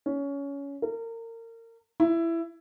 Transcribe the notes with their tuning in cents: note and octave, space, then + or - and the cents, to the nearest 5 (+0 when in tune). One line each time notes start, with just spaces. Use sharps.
C#4 +20
A#4 -30
E4 +15